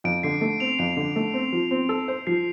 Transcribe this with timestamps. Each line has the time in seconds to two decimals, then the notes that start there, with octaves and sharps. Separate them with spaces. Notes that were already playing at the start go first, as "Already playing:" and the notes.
0.04 F2 D7
0.23 D3 C7
0.41 A3
0.60 C4 F7
0.79 F2 D7
0.97 D3
1.16 A3
1.34 C4
1.53 F3
1.71 C4
1.89 A4
2.08 C5
2.27 F3 C7